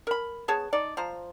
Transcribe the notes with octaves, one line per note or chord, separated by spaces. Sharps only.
A#4 B5
B3 G#4 C#5 A5
D#4 D5
F3 C5 A#5